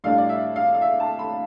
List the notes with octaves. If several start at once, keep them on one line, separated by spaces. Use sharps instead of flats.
A2 G3 D4 F5
D5
E5
F5
F5
E5
A5
B5